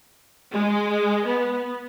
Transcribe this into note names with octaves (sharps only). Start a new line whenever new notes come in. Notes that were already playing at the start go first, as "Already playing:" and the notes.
G#3
B3